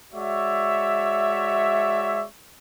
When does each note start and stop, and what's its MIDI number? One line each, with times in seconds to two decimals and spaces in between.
0.13 2.24 56
0.13 2.24 66
0.13 2.24 73
0.13 2.24 74
0.13 2.24 76